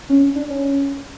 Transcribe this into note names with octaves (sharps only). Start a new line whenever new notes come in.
C#4
D4
C#4